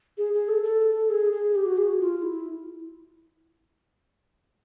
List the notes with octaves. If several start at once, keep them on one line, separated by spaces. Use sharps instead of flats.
G#4
G#4
A4
A4
G#4
G#4
G4
F#4
G#4
F#4
F4
E4